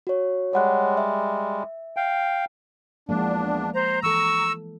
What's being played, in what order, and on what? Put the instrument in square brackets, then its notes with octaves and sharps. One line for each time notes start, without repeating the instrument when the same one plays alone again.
[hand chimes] F#4 C#5
[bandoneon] G3 G#3 [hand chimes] C#5 F#5 F#6
[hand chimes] E5
[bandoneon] F5 G5
[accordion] E2 D4 [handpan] F3 G#3 A#3
[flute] C5 [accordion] A#5
[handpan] E3 A4 [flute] C#6 [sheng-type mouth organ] E6